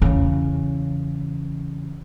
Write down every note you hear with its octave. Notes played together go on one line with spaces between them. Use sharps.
E2 C#3